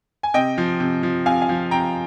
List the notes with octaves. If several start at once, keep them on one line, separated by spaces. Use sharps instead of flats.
G#5
C3 D#5 G5
F3
C3
F3
C3 F5 G#5
F5 G#5
F3
C3 G5 A#5